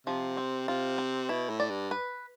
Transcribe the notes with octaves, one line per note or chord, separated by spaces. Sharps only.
C3 F3
C4
C3 F4
C4
B2 E4
A2
D5
G2
B4